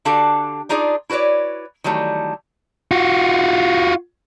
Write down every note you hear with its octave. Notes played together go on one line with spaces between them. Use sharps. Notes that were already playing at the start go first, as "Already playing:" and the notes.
D3 D4 F#4 G4 A4 F5
D4 D#4 F4 G#4 D5
E4 F#4 B4 C#5 D5
D#3 E3 F#3 G3 A3
F4 F#4